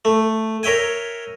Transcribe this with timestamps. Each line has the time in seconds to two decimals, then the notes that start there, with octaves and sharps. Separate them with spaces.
0.05 A3
0.63 A#4 C#5 E5 G5 G#5